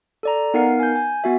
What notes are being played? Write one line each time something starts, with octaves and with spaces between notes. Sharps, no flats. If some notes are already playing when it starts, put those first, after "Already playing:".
A4 D5 A#5
B3 D#4 A#4 F5 F#5 C7
G#5 G6
G#5
B3 F#4 E5